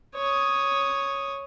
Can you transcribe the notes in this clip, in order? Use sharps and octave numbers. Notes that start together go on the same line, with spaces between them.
C#5 D#6